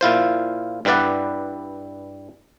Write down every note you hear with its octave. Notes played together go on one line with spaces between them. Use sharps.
A#2 E4 F4 C5
G2 G3 E4 B4 D5 F#5